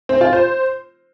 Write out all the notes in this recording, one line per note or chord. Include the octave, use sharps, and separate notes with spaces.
C4
F4
C5